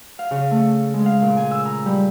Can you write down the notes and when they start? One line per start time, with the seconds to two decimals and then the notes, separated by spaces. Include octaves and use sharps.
0.19 F5
0.31 C#3
0.51 A3
0.94 G#3
1.06 F5
1.22 A#2
1.37 G#5
1.51 E6
1.66 A#5
1.85 G3